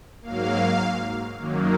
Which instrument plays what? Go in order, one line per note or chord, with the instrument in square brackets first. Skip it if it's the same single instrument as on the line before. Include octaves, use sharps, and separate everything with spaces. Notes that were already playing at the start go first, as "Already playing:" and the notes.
[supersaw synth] G#2 F#3 A#3 F5
F#2 D#3 F#3 A#3